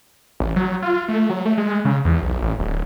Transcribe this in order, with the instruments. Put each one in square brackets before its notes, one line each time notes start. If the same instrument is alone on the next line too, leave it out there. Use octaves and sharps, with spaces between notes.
[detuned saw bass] A1
F#3
F4
A3
F#3
A3
G#3
C#3
E2
B1
A1
D1